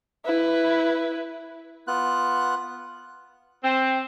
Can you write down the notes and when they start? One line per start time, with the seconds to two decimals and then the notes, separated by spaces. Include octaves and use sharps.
0.25 E4 B4
1.88 B3 F4 F#6
3.63 C4